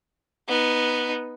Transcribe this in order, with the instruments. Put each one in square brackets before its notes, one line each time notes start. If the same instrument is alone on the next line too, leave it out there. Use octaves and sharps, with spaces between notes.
[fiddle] B3 D#4